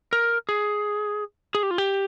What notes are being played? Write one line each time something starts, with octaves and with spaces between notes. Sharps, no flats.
A#4
G#4
G#4
G4
F4
G4